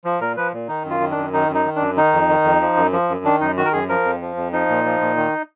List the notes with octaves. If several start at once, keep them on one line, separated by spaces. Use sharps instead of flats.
F3
A#2 A#4
F3 B4
A#2
D#3 D#4
F#2
F4
D#3
D4
F#2
D#3 D#4
F#2
D#4
D#3
F#2 D4
D#3 D#4
F2
D#3
F2
F3
F#2
F3
F#2
D#3 D4
F#2 D#4
D#3 F#4
A#4
F#2 G#4
F3 A#4
F2
F3
F2
F3 D#4
A#2
F3
A#2
D#3